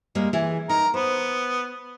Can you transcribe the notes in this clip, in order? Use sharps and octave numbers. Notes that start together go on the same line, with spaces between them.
G3 G#3 A#3
E3 G#4
D#4 A#4
B3 C5